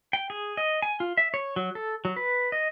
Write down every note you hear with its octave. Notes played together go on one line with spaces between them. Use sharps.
G5
G#4
D#5
G#5
F4
E5
C#5
F#3
A4
F#3
B4
D#5